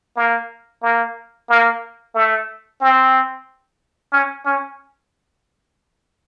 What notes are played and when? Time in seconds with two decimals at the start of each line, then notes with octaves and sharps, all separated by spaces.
0.16 A#3
0.83 A#3
1.50 A#3
2.15 A3
2.81 C4
4.13 C#4
4.46 C#4